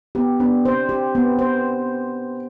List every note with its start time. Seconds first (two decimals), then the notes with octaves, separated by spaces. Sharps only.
0.15 B3 G4
0.40 B3 D4
0.65 C3 C5
0.89 G4
1.15 B3
1.39 C5